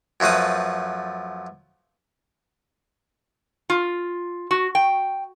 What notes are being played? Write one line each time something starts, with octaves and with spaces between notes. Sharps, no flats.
F#2 F3 A3 B4 D#6
F4
F#4
G5